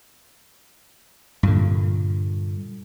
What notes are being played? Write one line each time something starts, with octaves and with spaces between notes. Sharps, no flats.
G2 A#2 D3